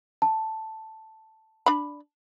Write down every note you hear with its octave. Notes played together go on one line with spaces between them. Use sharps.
A5
D4 B5